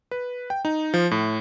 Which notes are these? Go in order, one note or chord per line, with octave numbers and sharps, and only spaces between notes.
B4
G5
D#4
F3
A2